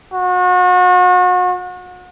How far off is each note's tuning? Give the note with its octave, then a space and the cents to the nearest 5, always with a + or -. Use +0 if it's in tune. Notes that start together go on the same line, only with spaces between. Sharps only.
F#4 -35